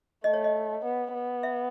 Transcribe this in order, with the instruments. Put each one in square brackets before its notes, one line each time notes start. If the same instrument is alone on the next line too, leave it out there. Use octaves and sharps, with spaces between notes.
[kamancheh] A3 [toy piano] D#5
[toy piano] C#5
D#5
[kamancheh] B3
B3
[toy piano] E5